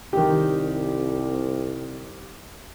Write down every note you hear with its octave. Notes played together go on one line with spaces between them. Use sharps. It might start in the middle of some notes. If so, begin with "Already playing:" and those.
C2 D#3 G4